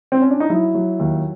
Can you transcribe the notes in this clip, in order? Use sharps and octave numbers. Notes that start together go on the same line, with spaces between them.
C4
C#4
D4
D#4
F#3 E4
F#3
D#2